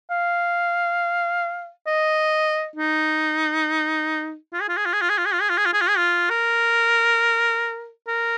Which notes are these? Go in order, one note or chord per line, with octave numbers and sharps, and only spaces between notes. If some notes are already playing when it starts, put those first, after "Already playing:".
F5
D#5
D#4
F4
G#4
F4
G#4
F4
G#4
F4
G#4
F4
G#4
F4
G#4
F4
G#4
F4
G#4
F4
G#4
F4
A#4
A#4